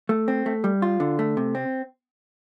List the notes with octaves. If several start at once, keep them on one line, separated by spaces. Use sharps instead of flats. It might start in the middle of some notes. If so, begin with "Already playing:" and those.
A3
C4
A3
G3
F4
D3
A3
C3
C4